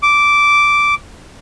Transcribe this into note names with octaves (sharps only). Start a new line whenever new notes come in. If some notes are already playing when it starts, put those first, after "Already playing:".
D6